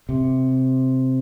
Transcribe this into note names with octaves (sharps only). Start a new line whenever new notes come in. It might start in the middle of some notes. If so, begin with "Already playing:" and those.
C3